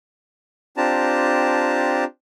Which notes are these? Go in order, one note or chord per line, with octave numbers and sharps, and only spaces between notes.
C4 D4 F4 G4 A5 A#5